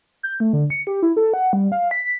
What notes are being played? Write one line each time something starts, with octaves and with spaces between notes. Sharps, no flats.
G6
A3
D3
C#7
G4
E4
A4
F#5
G3
F5
B6